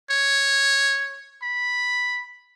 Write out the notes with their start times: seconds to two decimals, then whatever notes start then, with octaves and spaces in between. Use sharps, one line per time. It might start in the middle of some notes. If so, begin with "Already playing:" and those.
0.11 C#5
1.43 B5